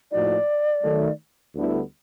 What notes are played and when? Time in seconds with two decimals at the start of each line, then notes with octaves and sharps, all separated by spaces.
0.11 A2 F3 A#3 D#4 F#4 D5
0.83 D#3 F#3 A3
1.54 D2 D3 G3 B3 E4